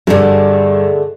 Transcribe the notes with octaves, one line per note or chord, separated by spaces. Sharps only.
G2 D3 G#3 A3